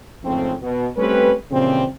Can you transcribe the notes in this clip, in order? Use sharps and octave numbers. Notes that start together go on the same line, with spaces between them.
F2 G#2 C#3 A3 C4
B2
G3 A3 C4 C#4 G4 B4
A#2 C#3 E3 F3 G3 C4